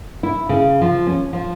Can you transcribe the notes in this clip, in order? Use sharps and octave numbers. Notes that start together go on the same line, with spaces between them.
E4
C#3
F3
C#4
F3